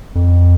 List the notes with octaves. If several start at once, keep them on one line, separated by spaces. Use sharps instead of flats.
F2